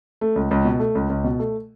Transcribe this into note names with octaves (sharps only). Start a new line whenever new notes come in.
A3
C#2
C#2
B2
A3
C#2
C#2
B2
A3